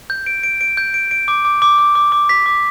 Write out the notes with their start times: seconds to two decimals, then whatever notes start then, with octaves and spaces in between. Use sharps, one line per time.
0.10 G6
0.26 D7
0.43 D7
0.61 D7
0.77 G6
0.94 D7
1.11 D7
1.28 D6
1.45 D6
1.62 D6
1.79 D6
1.95 D6
2.12 D6
2.29 B6
2.46 D6